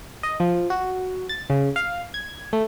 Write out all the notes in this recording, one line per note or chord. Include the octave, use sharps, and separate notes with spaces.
D#5
F3
F#4
A6
C#3
F5
G#6
A3